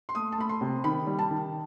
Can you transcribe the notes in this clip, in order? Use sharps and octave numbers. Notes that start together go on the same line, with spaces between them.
C6
A3 D#6
A5
A3 B5
C6
C3
D#3 B5
G3
A5
D#3